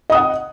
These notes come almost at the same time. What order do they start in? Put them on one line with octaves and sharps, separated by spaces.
D#5 D#6 F#5